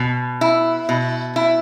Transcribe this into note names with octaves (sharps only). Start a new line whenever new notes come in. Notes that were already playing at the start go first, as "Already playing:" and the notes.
Already playing: B2
E4
B2
E4